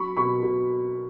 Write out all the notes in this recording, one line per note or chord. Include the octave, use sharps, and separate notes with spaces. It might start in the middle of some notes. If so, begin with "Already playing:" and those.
Already playing: F#3 B5 C#6
B2 B5 C#6
B2